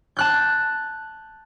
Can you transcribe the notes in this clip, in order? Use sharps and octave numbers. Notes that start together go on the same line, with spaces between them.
A5 F#6 G6